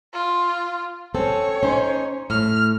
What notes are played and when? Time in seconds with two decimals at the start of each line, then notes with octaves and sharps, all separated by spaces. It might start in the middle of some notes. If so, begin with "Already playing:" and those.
0.14 F4
1.15 C4 C#4 A4 C#5
1.63 C#4 D#4 C5
2.30 A2 F6